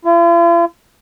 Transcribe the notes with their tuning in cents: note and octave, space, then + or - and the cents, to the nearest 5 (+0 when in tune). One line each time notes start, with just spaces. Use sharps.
F4 -45